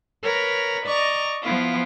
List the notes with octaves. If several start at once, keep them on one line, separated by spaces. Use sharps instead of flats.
A#4 B4 C#5 A#5
D5 D#5 A#5 C#6
F3 B3 E4 F4